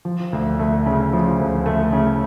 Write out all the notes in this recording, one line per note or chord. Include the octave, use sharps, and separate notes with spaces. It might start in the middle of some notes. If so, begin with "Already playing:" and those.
F3
D2
A3
C#3
F3
D2
A3
C#3